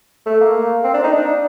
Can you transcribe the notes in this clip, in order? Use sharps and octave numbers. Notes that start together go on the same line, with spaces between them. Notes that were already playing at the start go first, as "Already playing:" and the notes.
A3
A#3
C4
D4
D#4
D4